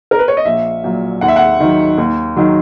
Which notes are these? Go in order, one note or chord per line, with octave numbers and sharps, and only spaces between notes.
A#4
B4
C#5
D#5
A#1 E5
A#2 F#3
D#2 F#5
E5
F#5
D#3 F#3
D#2
D#3 F#3